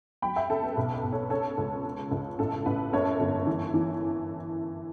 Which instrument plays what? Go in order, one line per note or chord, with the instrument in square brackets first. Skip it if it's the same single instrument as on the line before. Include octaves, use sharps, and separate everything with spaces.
[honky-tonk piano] F#3 G5 B5
E5 G5
C#3 A4
B4
B1 A4
B4
B1
A4 C#5
C#3 A4 C#5
C#2
C#3
C#2
A1 A4
A1 B4
F#2 A4 C#5
G1
E3
E3